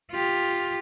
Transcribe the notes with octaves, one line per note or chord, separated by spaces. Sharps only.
F4 G4